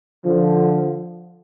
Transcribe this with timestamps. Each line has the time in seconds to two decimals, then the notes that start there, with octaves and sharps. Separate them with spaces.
0.25 D3 F3